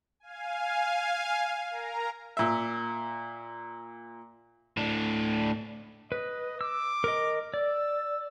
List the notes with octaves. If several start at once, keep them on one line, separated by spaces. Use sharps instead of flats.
F5 G#5
A#4 A#5
A#2 E5
A2 D4
B4 D#5
D6 E6
A#4 D#5
D5 E6